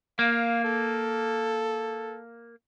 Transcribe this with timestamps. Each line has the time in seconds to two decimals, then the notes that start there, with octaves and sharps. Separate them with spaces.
0.19 A#3 F5
0.64 A4